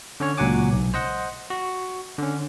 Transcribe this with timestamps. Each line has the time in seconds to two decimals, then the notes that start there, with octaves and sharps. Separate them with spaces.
0.20 D3 C#4 C#5
0.38 C#2 A#2 F#3 F#5 G#5 D6
0.72 B1
0.94 C5 D#5 F#5
1.50 F#4
2.18 D3 C#4